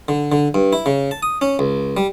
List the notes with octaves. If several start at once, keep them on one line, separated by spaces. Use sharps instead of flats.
D3
D3
G2
E4
C#3
A5
D#6
C#4
C#2
G3